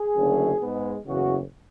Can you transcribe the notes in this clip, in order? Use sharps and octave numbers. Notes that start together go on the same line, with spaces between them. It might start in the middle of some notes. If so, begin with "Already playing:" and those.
Already playing: G#4
F#1 F#2 D3 A3
G#2 G#3 B3
F#1 E2 C#3 E3 F#4